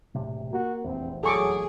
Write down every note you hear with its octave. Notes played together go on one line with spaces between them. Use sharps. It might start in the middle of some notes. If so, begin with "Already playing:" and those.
E1 A2 C3
A#3 F#4
F1 A#1 E2 C4
F#3 G#4 A4 C#6 D6